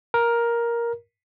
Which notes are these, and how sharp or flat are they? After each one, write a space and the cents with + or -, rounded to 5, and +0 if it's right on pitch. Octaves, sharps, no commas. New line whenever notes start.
A#4 +10